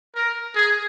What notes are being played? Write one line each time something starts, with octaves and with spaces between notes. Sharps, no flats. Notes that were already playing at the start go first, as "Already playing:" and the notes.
A#4
G#4